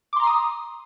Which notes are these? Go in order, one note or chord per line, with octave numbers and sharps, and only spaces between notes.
A#5 C6 D6 D#6 C7